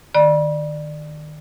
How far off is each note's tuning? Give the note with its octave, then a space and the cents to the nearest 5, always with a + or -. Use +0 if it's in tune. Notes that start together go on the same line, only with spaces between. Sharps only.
D#3 -25 D5 +20 B5 -40